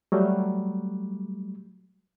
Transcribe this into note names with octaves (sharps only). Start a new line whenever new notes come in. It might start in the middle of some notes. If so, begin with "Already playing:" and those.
F#3 G3 A3